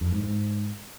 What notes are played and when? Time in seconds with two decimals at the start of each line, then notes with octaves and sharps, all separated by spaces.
0.01 F2
0.12 G#2
0.24 G#2